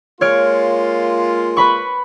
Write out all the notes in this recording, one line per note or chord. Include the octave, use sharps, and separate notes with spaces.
G#3 A#3 F4 C#5 F6 D7
B4 B5 C#6